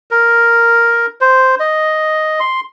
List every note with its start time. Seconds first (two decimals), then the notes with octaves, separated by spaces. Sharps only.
0.11 A#4
1.21 C5
1.60 D#5
2.40 C6